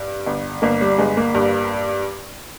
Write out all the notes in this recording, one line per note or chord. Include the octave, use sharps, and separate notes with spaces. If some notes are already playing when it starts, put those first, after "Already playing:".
Already playing: G2
G1
G1 A#3
G3
G1 G#3
A#3
G2